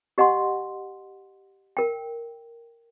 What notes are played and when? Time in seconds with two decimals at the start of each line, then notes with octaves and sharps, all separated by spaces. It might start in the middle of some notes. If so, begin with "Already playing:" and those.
0.18 G4 D#5 F#5 G#5 C6
1.77 A#4 G5